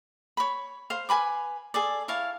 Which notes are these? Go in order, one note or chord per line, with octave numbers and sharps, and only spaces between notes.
C#5 B5
C5 F5
B4 G#5 B5 D6
G#4 A4 D5
E4 C#5 F5 A5